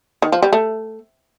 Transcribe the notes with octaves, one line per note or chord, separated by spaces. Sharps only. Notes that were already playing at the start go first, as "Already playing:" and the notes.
D#3
F3
G3
A3